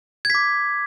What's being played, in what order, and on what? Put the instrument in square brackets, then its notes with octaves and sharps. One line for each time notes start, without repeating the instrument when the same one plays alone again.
[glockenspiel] G#6
B6
D6